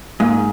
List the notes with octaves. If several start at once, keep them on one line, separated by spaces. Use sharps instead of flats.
G#2 A#3